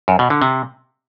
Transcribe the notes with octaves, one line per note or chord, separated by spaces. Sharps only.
F#2
B2
D3
C3